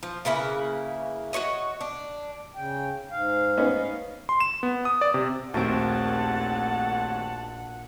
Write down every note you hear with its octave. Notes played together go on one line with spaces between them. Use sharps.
F3
C#3 A#3 E4 B4
F#4 G#4 C#5 D#5
D4
C#3 G5
G#2 F5
B3 C#4 D#4
C6
E7
B3
D#6
D5
C3
A#1 D#2 A3 C4 F#4 F#5 A5 D7